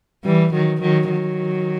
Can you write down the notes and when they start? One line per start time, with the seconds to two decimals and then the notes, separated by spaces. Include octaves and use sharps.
0.24 E3 G3
0.53 D#3 F#3
0.81 D#3 F#3
1.10 D#3 F#3